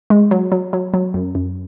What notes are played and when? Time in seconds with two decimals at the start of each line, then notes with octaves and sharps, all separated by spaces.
0.10 G#3
0.31 F#3
0.52 F#3
0.73 F#3
0.94 F#3
1.14 F#2
1.35 F#2